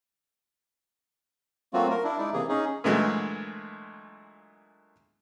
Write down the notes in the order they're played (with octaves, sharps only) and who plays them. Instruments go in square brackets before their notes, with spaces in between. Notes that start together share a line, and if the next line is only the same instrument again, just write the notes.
[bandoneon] F#3 A3 A#3 C4 F4 F#4
A#4
D4 E4
G#3 D#4 E4 D5
C3 E3 A#3 G#4
C#4 D#4 G#4
[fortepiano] A#2 D3 E3 F#3 G#3 A3